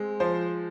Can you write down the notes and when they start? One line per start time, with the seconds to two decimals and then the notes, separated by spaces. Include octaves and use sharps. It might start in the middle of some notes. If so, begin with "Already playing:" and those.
Already playing: G#3 C4
0.20 F3 C5